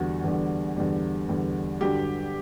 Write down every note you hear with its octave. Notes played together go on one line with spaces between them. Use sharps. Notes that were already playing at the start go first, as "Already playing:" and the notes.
Already playing: E2 D3 G3 F#4
E2 D3 G3
E2 D3 G3
E2 D3 G3
G2 D3 F#3 G4